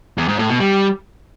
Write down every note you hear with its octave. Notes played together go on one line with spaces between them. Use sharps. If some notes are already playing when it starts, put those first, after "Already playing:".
E2
G#2
A2
B2
G3